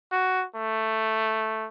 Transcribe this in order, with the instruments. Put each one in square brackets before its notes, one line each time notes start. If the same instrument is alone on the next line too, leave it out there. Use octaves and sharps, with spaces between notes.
[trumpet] F#4
A3